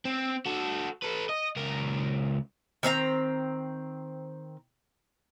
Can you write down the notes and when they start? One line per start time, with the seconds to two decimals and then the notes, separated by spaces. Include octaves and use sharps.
0.05 C4
0.46 F#4 A4
1.02 A4 B4
1.29 D#5
1.56 C#2 A#4
2.83 D#3 C4 D4 A#5